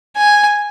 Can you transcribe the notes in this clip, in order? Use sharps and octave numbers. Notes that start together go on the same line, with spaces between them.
G#5